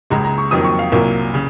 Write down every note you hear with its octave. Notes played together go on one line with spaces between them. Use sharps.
C#2 C#3 G#3 A#5
A#5
C#6
F2 D#3 F#3 A#3 D#6
C#6
F5
C2 A#2 F#3 A#3
C#3